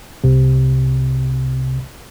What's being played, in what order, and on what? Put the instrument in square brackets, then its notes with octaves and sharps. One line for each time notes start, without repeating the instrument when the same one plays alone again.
[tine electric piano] C2 C3